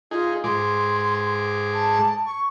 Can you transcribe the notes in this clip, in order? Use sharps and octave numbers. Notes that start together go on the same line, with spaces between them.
D#4 F4 G#4
G#2 G#4 C6 D6
A5
C#6